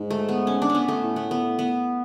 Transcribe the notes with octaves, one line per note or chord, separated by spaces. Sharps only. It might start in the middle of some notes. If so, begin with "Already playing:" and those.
Already playing: G#2
A3
B3
C#4
D4
C#4
B3
A3
A2
B3
B3
B3